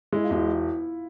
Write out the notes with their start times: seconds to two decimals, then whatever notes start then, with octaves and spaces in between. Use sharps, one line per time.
0.13 G#3 E4
0.24 F4
0.30 E1
0.35 E4